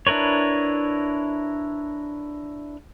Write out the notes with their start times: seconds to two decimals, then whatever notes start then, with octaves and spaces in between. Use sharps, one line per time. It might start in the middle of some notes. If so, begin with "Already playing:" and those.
0.07 D4 E4 A#4 B4 C#5